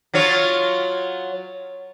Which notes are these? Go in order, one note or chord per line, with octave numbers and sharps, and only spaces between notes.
F#3 F4 C#5